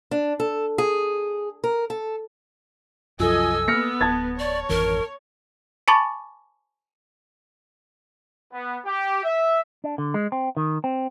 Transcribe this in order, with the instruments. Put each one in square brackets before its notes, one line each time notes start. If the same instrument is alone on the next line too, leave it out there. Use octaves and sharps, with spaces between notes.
[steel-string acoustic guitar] D4
A4
G#4
A#4
A4
[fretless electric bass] C2 F#2 [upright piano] F3 [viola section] A4 D#5 G#5 [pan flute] E6
[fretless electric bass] A#3 [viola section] B3 [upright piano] F6 A#6 C#7
[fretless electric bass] D1 [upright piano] A5 G#6 A6
[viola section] C#5 [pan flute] D5
[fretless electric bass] G#1 F2 E3 [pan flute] A#4
[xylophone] G#5 A5 B5 C#6 D6 A6
[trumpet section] B3
G4
E5
[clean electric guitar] D4
D3
G#3
C4
D#3
C4